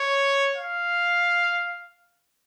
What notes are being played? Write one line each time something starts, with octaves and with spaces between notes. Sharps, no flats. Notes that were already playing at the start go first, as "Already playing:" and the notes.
Already playing: C#5
F5